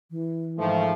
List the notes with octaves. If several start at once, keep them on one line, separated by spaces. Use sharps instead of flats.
E3
G#2 D#3 F3 A3